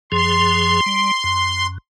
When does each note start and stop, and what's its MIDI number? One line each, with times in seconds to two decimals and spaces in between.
0.12 0.81 42
0.12 0.81 53
0.12 0.81 68
0.12 1.67 84
0.86 1.12 55
1.24 1.78 42